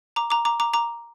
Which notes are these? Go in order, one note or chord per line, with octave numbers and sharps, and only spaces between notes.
A#5 D6
A#5 D6
A#5 D6
A#5 D6
A#5 D6